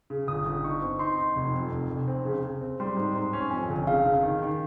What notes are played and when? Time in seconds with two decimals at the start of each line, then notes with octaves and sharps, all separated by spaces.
0.10 C#3
0.28 G1 D#6
0.46 G1
0.63 D#4 C#6
0.82 C4
0.99 D#4 C6
1.18 D#4
1.36 F1
1.54 F2
1.72 F1
1.90 F1
2.08 C4
2.25 C#3
2.43 C#3
2.61 C4
2.80 G3 C6
2.97 G#2
3.15 G#2 C6
3.33 C#4
3.51 F2 G#5
3.69 G1
3.87 C#3 F5
4.05 C#3
4.23 D#3
4.42 D#3